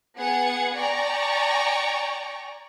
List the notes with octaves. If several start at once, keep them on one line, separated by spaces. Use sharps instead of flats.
B3 G#4 F#5 G#6 C#7
D5 G5 G#5 A#5 C#6